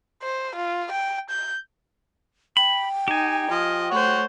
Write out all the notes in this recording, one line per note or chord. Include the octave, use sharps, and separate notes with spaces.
C5
F4
G5
G6
G5 B5
D#4 G4 G#5
F3 D#5
A3 C5 C#5 F#5 C#6